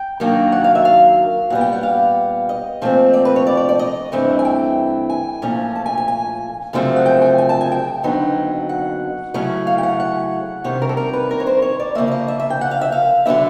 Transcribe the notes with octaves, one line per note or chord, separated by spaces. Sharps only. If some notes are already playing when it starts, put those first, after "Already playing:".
Already playing: G5
F#2 D#3 F#3 A#3 D4
F#5
F5
E5
F5
A#2 G3 B3 F#5
G5
F#5
F5
D#5
A#2 F3 A3 C4
D5
B4
C#5
D5
D5
D5
D#5
G2 E3 A3 C4 E4
G#5
G5
G#5
A#2 F3 A3 C#4
A5
G#5
G#5
G#5
F#2 C#3 F3 A3 C4
F#5
G5
G#5
G#5
A5
G#5
G5
F2 D3 F#3 B3 D#4
F#5
C#3 F#3 A3 C#4 E4
F5
G5
F#5
F#5
C3 D#3 G3 C#5
A#4
A4
A#4
B4
A#4
C#5
C5
C#5
D5
C#3 F3 A#3 E5
D5
D#5
E5
E5
G5
F#5
F5
E5
F5
D3 F#3 B3 D4 E5